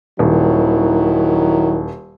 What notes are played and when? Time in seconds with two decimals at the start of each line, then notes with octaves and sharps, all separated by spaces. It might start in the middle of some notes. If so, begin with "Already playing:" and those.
0.19 D#1 D#3 F#3 E4